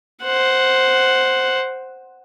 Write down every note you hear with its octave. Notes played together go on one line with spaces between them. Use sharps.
C5 F#5